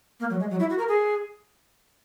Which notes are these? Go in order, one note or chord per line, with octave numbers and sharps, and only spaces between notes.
A#3
F#3
G#3
F#3
E4
F#4
A#4
G#4